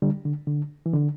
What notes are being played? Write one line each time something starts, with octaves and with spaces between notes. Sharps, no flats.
D3 G3
D3
D3
E3
D3